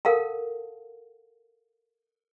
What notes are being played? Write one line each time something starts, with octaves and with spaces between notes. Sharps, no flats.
A4 A#4 F5 F#5 A5